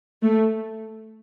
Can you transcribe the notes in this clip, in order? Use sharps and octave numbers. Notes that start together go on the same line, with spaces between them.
A3